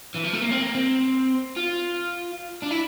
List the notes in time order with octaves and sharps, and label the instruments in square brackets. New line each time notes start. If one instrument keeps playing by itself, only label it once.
[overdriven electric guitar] E3
F3
A3
A#3
C4
A#3
C4
F4
D4
E4